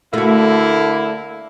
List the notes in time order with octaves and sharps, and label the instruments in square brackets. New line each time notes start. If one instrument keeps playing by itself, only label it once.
[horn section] D3 A#3 E4 [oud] A3 F#4